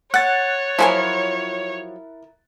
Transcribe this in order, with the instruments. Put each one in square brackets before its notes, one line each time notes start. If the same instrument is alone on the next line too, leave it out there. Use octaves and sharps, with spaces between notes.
[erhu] C#5 [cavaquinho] F#5 [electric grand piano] F#6 A6
[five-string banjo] F3 F#3 [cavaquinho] E4 G#4 A#4